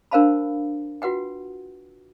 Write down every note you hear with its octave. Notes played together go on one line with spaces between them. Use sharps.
D4 A#4 C5 F5 A5 B5
F4 F#4 B4 F#5 G5